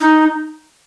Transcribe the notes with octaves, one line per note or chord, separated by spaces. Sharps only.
D#4